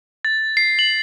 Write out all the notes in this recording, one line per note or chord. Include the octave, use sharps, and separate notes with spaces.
A6
C7
F#7